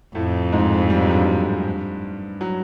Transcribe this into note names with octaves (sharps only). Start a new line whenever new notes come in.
F2 A2 A3
G#2 G#3
G3
F#3
G2 G3
F#3